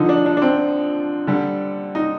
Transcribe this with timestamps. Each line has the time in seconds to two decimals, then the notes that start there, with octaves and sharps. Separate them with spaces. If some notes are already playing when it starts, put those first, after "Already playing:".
Already playing: D3 F3 D#4
0.09 D4
0.26 D4
0.37 D4
0.42 C4
1.27 D3 G3
1.95 D#4